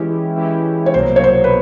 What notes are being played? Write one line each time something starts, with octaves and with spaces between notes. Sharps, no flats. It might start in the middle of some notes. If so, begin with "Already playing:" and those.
Already playing: E3 G#3 C#4 E4 G4
E3 G#3 C#4 E4 G4
C#5
C2 B2 F#3 A#3 C5
C#5
C5
B4